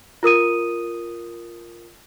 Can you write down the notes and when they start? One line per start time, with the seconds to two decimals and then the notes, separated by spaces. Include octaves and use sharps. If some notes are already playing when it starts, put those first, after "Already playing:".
0.23 F4 A#4 D#6 D#7